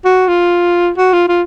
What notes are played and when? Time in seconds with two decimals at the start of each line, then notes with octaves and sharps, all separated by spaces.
0.05 F#4
0.28 F4
0.97 F#4
1.13 F4
1.28 F4